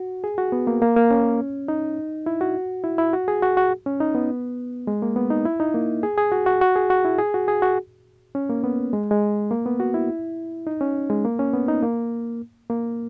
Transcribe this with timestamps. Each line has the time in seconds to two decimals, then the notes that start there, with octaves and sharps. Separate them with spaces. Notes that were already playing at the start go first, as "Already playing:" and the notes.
Already playing: F#4
0.24 G#4
0.38 F#4
0.52 B3
0.67 A#3
0.82 A#3
0.96 A#3
1.11 C#4
1.68 D#4
2.26 E4
2.41 F#4
2.84 E4
2.98 E4
3.13 F#4
3.28 G#4
3.42 F#4
3.57 F#4
3.86 C#4
4.00 D#4
4.15 B3
4.87 G#3
5.02 A#3
5.16 B3
5.30 D#4
5.45 E4
5.60 D#4
5.74 A#3
6.03 G#4
6.18 G#4
6.32 F#4
6.46 F#4
6.61 F#4
6.76 G#4
6.90 F#4
7.05 E4
7.19 G#4
7.34 F#4
7.48 G#4
7.62 F#4
8.35 C#4
8.50 A#3
8.64 B3
8.93 G#3
9.11 G#3
9.51 A#3
9.66 B3
9.80 F#4
9.94 E4
10.67 D#4
10.81 C#4
11.10 G#3
11.25 A#3
11.39 C#4
11.53 B3
11.68 D#4
11.83 A#3
12.70 A#3